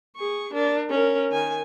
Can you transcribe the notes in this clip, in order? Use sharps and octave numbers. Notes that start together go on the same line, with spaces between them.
G#4 C#6
D4 A#4
C#4 A#4
D#3 G#5